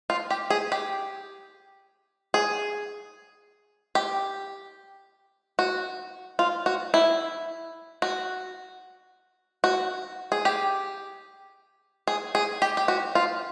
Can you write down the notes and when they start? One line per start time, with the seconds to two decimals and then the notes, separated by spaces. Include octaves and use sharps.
0.10 F4
0.30 G4
0.50 G#4
0.72 G4
2.34 G#4
3.95 G4
5.59 F#4
6.39 F4
6.66 F#4
6.94 E4
8.02 F#4
9.64 F#4
10.32 G#4
10.45 G4
12.07 G#4
12.35 G#4
12.62 G4
12.77 G4
12.88 F#4
13.15 F4